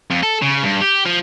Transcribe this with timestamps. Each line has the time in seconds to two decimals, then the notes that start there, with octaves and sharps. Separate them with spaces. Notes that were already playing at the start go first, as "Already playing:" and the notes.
0.11 F2
0.23 A4
0.42 C#3
0.63 G2
0.81 G4
1.06 F3